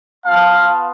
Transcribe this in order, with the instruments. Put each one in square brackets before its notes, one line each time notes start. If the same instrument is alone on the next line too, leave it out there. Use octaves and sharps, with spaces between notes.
[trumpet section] B3 F4 F5 A5